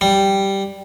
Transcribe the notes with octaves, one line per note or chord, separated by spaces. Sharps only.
G3